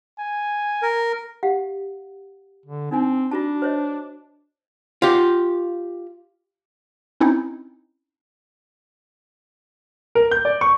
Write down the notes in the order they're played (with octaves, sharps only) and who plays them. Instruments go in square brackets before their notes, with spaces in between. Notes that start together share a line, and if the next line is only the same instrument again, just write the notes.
[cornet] G#5
[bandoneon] A#4
[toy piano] G4 F5 F#5
[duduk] D3
[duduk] C4 [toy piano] D4 D#4 G#5
[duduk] D4 [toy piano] F4 F#4 A5
[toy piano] C5 C#5 D#5
[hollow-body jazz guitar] F4 G4
[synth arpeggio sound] C4 C#4 D#4 E4
[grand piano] A#4
G6
D5
C#6